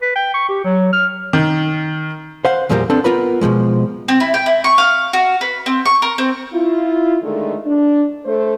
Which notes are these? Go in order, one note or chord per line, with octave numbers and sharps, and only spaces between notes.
B4
G5
C#6
G4
F#3
F6
D#3
C5 F5 F#5
E2 A#2 F3 G3 G#3 A#3
B3 C4 D4 A4
B3 F4 A#4 B4 B5
B2 E3 F3 G#3
C4
E4
G5
E4
C#6
F5
F#4
B4
C4
C#6
A#4
C4
E4 F4
D3 D#3 G#3 A3
D4
A3 C5